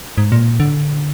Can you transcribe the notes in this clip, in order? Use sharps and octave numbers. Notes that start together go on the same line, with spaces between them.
G#2
A#2
D3